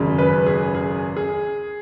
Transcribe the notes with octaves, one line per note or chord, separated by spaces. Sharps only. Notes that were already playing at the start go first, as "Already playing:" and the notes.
Already playing: G#1 F#2 C#3
B4
G#4
G#4
G#4